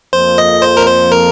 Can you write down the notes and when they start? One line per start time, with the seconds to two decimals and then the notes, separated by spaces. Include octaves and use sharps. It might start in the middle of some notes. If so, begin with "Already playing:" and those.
0.13 F2 F3 A#3 C5
0.38 D#5
0.62 C5
0.77 A#4
0.86 C5
1.12 A#4